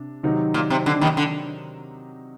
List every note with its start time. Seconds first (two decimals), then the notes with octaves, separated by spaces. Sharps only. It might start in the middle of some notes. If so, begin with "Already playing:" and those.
Already playing: C3 D4
0.23 C3 D#3 F#3 C4 D#4
0.54 A#2
0.70 C3
0.86 D3
1.01 D#2 D#3
1.17 D3